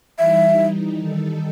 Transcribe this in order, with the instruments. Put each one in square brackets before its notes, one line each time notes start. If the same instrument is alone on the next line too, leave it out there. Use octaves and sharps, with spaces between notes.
[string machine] E3 G3 D#4 [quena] E5
[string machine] D#3 G3 D#4 A4